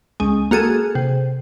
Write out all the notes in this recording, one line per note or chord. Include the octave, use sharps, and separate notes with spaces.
C#2 G#3
A#3 F#4 G#4 A4
C3